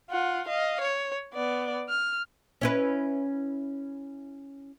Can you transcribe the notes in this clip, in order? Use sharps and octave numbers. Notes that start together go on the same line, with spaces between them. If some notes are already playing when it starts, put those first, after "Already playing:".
F4 F#5
D#5 F5
C#5
B3 D5
F6
C#4 E4 B4